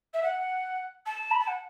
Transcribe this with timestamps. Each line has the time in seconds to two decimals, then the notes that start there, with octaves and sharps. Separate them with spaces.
0.13 E5
0.22 F#5
1.06 A5
1.31 B5
1.39 A5
1.47 F#5